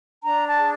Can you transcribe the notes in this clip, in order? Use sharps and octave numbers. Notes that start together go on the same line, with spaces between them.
D4 A#5
A5
G#4